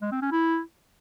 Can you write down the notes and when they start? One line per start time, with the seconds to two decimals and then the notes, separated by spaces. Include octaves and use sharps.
0.02 G#3
0.12 C4
0.22 C#4
0.32 E4